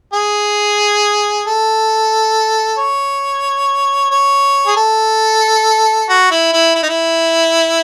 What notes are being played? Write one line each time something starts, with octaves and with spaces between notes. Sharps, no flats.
G#4
A4
C#5
C#5
G#4
A4
F#4
E4
E4
E4
D#4
E4